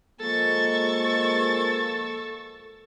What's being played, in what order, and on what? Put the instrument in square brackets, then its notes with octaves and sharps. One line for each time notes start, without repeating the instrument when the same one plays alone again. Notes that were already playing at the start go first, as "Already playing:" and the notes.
[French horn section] F3 G#3 A#3 [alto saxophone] A4 [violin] C#6 A6